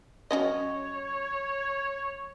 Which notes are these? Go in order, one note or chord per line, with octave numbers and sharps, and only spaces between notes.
F#3 C#4 C#5 D#5